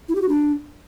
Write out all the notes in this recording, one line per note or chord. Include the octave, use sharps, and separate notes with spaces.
E4
G4
F#4
D4